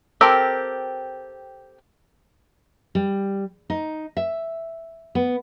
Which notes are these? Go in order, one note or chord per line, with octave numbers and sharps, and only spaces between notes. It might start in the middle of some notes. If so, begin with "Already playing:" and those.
C4 G4 A4 A#4
G3
D#4
E5
B3